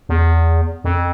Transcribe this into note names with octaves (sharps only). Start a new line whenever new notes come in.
E2
F2